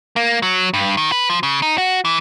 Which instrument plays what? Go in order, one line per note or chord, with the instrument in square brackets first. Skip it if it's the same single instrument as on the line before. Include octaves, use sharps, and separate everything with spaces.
[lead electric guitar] A#3
F#3
G2
D#3
B4
F3
C#3
D#4
F#4
E3